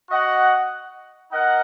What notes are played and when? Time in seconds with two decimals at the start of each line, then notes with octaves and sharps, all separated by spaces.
0.11 F#4 D#5 F#5
1.31 D#4 A#4 D#5 F#5